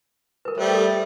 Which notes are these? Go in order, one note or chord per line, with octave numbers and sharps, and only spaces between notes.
A#4 B4
G3 A3 C5
A4